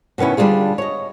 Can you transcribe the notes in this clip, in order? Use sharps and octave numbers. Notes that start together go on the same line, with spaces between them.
B2 D#3 B3 C#4 E4
D3 G3 B3 D4 F4 G#4
C#5 D#5